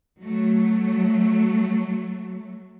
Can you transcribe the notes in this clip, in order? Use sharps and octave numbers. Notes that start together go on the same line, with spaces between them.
F#3 A3